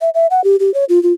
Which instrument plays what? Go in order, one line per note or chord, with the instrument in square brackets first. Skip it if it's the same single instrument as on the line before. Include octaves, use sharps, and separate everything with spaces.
[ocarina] E5
E5
F#5
G4
G4
C#5
F4
F4